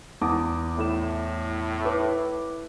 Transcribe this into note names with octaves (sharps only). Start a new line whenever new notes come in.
E2 A5 D6 D#6
A2 A3 E4 E7
E4 B4 D6